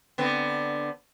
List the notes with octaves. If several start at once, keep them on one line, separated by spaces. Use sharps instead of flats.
D3 B3 C4